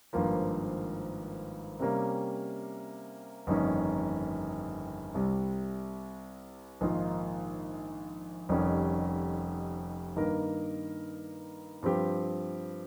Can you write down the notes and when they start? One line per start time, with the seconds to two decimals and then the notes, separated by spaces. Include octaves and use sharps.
0.13 G#1 G2 F3 A#3
1.79 C3 G3 A#3 C#4
3.47 G1 F2 D#3 A#3 C#4
5.14 C2 C3 G3
6.81 A#1 G#2 D#3 A#3 F4
8.49 F1 F2 D#3 G3 C#4
10.16 G2 D#3 A#3 D#4 A#4
11.83 G2 F3 C4 G4